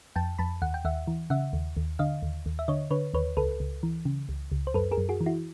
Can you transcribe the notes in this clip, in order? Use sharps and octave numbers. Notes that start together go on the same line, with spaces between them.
F2 G5 A5
F2 A5 B5
D#2 F#5
G5
D#2 E5 F#5
E3
C#3 E5 F#5
D#2
D#2
D3 D#5 F5
D#2
D#2
E5
D3 C#5 D#5
D3 B4 C#5
D#2 B4 C#5
C#2 A4 B4
C#2
E3
C#3
C#2
C#2
C5
F#2 A4 B4
G#4 A#4
F#2
F#4 G#4
E3
E4 F#4